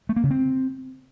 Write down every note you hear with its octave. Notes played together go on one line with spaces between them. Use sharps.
A3
A#3
C#3
C4